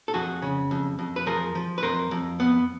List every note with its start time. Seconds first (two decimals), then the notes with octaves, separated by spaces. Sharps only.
0.08 A4
0.14 F2 F#4 G#4
0.42 C#3
0.71 F2
0.99 F2
1.16 B4
1.27 F3 G#4 A#4
1.55 F3
1.78 B4
1.82 F2 A#4 C5
2.11 F2
2.40 B3